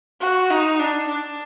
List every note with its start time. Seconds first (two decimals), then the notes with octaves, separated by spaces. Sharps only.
0.22 F#4
0.50 D#4
0.79 D4
1.08 D4